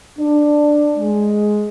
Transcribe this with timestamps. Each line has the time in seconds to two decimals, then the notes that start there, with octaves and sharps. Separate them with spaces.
0.19 D4
0.98 G#3